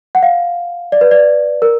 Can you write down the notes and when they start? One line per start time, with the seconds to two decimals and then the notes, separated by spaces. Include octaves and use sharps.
0.15 F#5
0.23 F5
0.92 D5
1.01 B4
1.11 D5
1.62 A#4